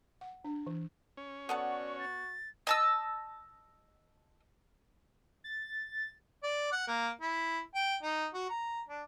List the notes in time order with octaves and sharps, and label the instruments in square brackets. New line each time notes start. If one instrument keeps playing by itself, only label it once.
[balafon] F#5
D4
E3
[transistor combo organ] C#4
[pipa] B3 A4 F#5 [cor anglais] F#4 [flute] D5
[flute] A6
[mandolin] D#5 A5 E6
[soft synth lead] A6
[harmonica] D5
F#5
A#3
E4
G5
D#4
F#4
A#5
D4